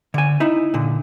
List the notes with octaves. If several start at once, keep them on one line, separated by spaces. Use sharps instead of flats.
D3 G#5
D#4 E4
A#2 D3